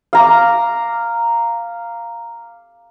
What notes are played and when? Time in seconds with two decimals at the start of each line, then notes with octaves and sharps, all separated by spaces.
0.13 F5 A#5 D6